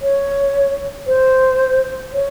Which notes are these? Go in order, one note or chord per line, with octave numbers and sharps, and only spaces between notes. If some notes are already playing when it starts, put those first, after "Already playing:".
C#5
C5
C#5